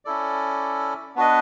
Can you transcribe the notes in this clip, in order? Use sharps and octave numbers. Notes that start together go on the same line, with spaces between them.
C#4 E4 A4 D5
B3 D4 F#4 B4 D#5